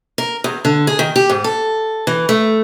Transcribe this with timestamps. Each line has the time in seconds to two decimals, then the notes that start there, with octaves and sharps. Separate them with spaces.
0.18 A#4
0.44 E2
0.65 D3
0.87 G#4
0.99 D#3
1.16 G4
1.30 G#2
1.44 A4
2.07 E3
2.29 A3